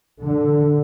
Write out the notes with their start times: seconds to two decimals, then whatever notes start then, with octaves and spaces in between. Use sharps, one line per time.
0.22 D3